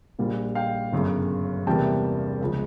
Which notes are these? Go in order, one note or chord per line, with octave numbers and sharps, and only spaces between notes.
A#1 A#2 G3
F5 G5
G1 F#2 C#3
E2 C3 E3 G3 A#3 G5 A5
C#2 C#3 F3